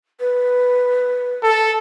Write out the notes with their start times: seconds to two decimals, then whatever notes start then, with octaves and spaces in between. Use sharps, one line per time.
0.20 B4
1.43 A4